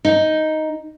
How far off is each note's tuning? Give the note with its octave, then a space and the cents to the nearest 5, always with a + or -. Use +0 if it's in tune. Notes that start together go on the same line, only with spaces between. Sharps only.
D#4 +5